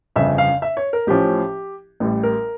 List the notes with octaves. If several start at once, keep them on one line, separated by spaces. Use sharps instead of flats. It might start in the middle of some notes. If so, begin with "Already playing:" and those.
G1 F2 C#3 E5
F5
E5
C#5
A#4
A1 A2 F3 C#4 G4
A1 A2 G3
A#4